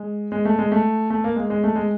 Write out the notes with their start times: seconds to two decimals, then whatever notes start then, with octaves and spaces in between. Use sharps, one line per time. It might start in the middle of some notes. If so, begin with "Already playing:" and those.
Already playing: G#3
0.32 G#3
0.45 A3
0.59 G#3
0.72 A3
1.10 A3
1.24 A#3
1.36 G#3
1.50 G#3
1.64 A3
1.76 G#3